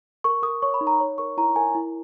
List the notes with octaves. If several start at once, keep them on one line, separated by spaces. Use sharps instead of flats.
A#4 C#6
A#4 D#6
C#5 C#6
B5
D#4
A#5
C#5
A#4 C#6
E4 A#5
A#4 G#5
E4